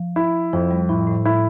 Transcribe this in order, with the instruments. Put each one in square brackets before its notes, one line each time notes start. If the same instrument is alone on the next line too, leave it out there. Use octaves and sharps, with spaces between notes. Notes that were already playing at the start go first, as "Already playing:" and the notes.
Already playing: [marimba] F3
[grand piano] E4
[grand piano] F2 [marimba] F3
[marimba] G3
[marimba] A2 [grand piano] E4
[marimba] A2
[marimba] A2 [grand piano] E4